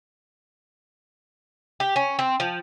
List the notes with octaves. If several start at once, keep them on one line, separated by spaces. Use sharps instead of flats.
G4
C#4
C4
F3